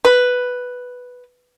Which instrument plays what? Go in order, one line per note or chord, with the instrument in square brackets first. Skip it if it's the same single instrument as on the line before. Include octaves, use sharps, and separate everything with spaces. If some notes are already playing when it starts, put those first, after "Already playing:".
[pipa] B4